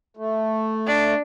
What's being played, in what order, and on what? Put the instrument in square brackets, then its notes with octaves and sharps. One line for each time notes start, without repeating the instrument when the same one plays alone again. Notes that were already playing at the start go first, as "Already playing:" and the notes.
[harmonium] A3
[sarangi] D4